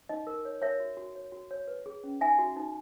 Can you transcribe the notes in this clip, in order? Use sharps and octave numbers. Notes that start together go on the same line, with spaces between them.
D#4 D#5
A#4
C#5
A#4 C#5 E5
F#4
F#4
C#5
F#4
C#5
B4
G#4
C#4
D#4 E5 G#5
F#4
D#4